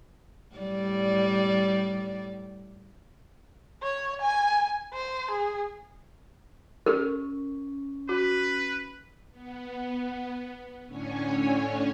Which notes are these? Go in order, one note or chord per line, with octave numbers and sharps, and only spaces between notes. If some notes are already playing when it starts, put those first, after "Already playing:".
A2 G3 D5
C#5
G#5
C5
G#4
C#4 G4 A4 A#4 C#6
F#4 B4
B3
A2 D3 C#4 C#5 G#5